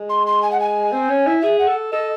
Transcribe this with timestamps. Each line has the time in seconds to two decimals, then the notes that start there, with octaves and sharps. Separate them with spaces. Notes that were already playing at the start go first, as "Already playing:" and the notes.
Already playing: G#3
0.09 C6
0.27 C6
0.42 G#5
0.52 F#5
0.60 G#5
0.92 C4
1.09 C#4
1.26 E4
1.42 G#4 E5
1.59 F#5
1.68 A4
1.92 A4 D#5